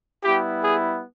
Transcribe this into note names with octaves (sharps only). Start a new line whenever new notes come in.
G3 B3 E4 G4
G#4